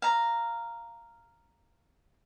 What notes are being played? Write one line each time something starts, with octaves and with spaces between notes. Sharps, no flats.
F5 A#5